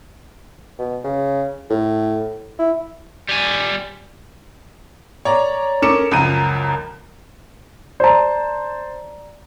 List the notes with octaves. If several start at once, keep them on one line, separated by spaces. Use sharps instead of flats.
B2
C#3
A2
E4
G3 G#5
C#5 D5 A#5
C#4 A4 A#4 D6 C#7 E7
C#2 F#2 F3 A#5 D#7
C5 D5 A5 A#5